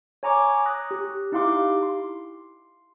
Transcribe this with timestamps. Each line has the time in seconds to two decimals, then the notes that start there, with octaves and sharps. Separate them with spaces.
0.23 C#5 G#5 A#5 C#6 D6
0.66 D#6 F#6 A#6
0.91 G4
1.32 D#4 E4 G4 F5 C6 D6
1.83 C6